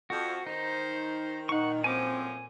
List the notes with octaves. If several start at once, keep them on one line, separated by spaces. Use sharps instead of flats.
F2 F#4
D#3 D#4 C5
A#2 D#4 F#5 C#6
F#2 A2 F3 C4 G#5 D6